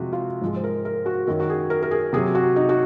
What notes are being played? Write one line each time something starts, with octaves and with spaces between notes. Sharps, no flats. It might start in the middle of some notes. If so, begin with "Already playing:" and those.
Already playing: F2 C3 F3 G#3 F4 F#4 G#4
F4
G#2 F3 G#3
C5
A#4
A#4
F#4
F#2 D#3 F#3 A#4
F#4
G#4
A#4
A#4
G#4
C3 F#3 G#4
F#4
D#4
F#4